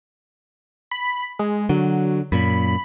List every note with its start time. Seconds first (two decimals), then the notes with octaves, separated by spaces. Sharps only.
0.91 B5
1.39 G#3
1.69 D3 F#3
2.32 F#2 A#2 B5